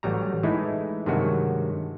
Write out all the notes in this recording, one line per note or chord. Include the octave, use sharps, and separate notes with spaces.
A1 F#3 G3 A#5
E3 G#3 A3 D#4 E4
G2 C3 D#3 F#3 G#3 F#4